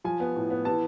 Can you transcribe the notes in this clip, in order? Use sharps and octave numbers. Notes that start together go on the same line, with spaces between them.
F3 G#5
B3
A2
B3
E3 A5